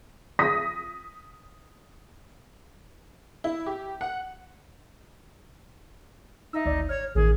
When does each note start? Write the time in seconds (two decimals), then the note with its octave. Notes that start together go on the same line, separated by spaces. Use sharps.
0.39 D#6 A#6 B6
3.44 E4
3.66 G4
4.01 F#5
6.53 D#4 E5 E6
6.65 G#1 D2 D5
6.89 C#5 F6
7.15 A1 D#3 G#4